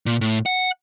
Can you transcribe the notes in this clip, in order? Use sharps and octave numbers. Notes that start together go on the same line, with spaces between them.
A#2
A2
F#5